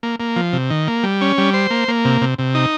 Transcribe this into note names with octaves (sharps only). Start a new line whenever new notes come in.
A#3
A#3
F3
C3
D#3
A#3
G3
C#4
G3
C5
A#3
A#3
C3
C3
C3
D#4